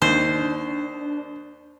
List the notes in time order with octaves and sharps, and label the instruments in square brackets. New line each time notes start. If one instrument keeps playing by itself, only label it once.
[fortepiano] D#2 [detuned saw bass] D4 [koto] C5